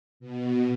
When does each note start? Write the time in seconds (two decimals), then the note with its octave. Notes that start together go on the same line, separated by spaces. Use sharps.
0.20 B2